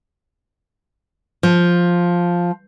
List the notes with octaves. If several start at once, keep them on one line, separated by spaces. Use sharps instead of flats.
F3